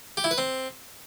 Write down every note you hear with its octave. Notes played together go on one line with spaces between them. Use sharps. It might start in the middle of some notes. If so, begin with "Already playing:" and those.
G4
E4
B4
C4